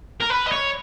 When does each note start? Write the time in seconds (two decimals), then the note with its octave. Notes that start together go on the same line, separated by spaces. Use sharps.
0.21 A#4
0.30 B4
0.47 D#5
0.52 C#5